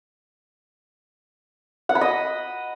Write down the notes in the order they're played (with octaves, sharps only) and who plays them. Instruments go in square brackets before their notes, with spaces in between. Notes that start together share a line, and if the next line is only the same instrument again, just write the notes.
[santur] F#5
B5
D#5